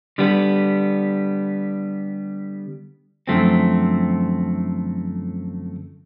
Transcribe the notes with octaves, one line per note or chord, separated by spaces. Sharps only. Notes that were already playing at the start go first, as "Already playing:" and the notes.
D3 G3 B3
F#2 D3 F3 A3 C4